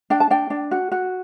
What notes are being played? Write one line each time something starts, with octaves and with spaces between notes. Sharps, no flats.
D4 G5
A5
D4 G5
D4
F#4
F#4